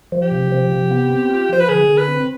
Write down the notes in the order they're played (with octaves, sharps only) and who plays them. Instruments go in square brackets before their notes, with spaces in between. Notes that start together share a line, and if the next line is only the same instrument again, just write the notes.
[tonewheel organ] F3
[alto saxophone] G4
[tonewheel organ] C3
F3
C3
B3
C4
F4
[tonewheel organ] F3 [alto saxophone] C5
[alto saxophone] B4
[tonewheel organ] D3 [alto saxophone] G#4
[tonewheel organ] D3
[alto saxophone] B4
[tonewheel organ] C4